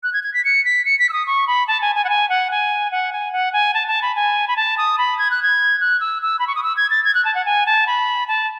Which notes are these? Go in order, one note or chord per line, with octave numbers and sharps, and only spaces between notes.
F#6
G#6
G#6
B6
C#7
B6
C#7
B6
E6
D#6
C#6
B5
A5
G#5
G#5
F#5
G#5
F#5
G#5
F#5
G#5
F#5
G#5
A5
A5
B5
G#5
B5
A5
D#6
B5
G#6
F#6
G#6
F#6
E6
E6
B5
C#6
D#6
E6
G#6
A6
G#6
F#6
A5
F#5
G#5
A5
B5
A5